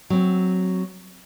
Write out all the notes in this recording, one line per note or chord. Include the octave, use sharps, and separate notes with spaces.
F#3 C4